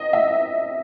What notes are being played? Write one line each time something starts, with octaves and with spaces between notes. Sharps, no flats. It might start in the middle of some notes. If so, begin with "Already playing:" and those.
Already playing: D#5
E5